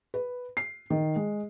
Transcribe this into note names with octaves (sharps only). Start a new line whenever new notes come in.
B4
C7
D#3
G#3